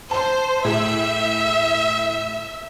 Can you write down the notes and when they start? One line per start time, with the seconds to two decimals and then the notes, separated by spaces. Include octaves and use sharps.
0.11 C5 A5 C6
0.65 A2 G#4 E5